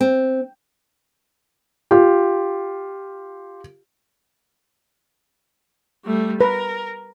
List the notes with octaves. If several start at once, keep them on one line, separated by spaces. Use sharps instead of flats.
C4
F4 G4
G3 A3
A#4 B4